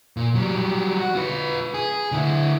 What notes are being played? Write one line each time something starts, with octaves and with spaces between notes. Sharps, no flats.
A#2
F#3 G3
F#4
F4 B4
G#4
D3 E4